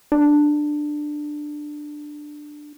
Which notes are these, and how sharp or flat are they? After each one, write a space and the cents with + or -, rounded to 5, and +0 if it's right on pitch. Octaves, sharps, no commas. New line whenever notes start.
D4 +15